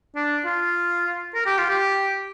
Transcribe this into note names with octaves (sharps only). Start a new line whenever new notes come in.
D4
F4
A#4
G4
F4
G4